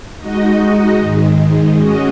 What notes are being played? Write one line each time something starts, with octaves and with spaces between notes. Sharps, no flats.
G#3 D#4 F#4 D#5
G#2 D#3 G#3
G#3 C#4 F#4 D#5